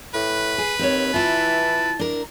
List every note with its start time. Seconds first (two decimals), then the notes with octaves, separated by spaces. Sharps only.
0.14 A2 B4
0.58 G#4
0.79 D#2 C4 C#5
1.14 E3 E4 F4 A5
1.99 D4 A#4